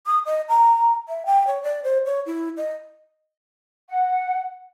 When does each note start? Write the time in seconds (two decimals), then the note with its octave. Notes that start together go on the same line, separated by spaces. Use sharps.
0.07 D#6
0.26 D#5
0.49 A#5
1.08 E5
1.26 G5
1.47 C#5
1.63 D5
1.84 C5
2.06 C#5
2.26 E4
2.57 D#5
3.88 F#5